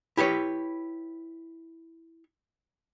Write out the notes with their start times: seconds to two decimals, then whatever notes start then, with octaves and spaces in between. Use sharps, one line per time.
0.17 E4 G4 B4 C#5